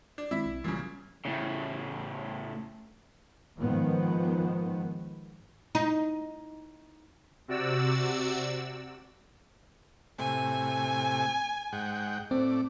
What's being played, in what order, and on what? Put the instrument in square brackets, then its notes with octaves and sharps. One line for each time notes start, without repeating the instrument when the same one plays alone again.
[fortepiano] D4
[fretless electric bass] D#3 G#3 C4 [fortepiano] E4 E5
[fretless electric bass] B1
[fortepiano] A#2 C#3 [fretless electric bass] E3 F#3 G3
[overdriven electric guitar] A2 C#3
[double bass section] G#2 D#3 F3 B3
[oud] D#4
[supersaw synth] C3 F#4 D5 E6
[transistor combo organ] A2 C3 [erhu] G#5
[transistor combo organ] G#2 F#5 G5
[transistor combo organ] A2 D5 [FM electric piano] C4